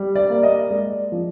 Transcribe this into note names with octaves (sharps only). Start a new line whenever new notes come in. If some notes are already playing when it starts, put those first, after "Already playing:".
Already playing: G3
D5
A#3
D#5
G#3 D5
F3